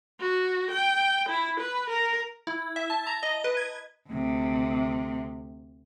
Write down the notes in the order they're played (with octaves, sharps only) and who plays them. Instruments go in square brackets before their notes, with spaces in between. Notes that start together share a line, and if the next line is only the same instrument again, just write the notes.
[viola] F#4
G5
E4
B4
A#4
[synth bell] E4
E5
A5
A#5
D#5
B4
G#6
[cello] D2 C3